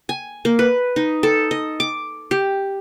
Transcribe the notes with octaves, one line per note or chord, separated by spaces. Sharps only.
G#5
A#3
B4
D#4
A4
D#5
D6
G4